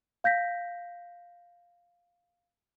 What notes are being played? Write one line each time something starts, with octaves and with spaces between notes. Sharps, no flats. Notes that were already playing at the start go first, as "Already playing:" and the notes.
F5 G6 A#6 B6